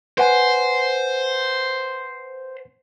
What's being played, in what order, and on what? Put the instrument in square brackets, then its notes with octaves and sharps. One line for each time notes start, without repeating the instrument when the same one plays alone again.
[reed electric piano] B4 F#5 G#5 [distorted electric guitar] C5